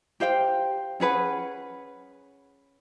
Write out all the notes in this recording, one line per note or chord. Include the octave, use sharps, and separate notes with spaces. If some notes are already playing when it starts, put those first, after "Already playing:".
G4 C5 F5 G5
C#4 G#4 B4 F#5